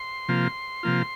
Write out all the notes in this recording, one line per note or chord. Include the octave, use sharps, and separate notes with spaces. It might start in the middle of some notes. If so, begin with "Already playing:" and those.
Already playing: C6
C3 F3 A#3 F4
C3 F3 A#3 F4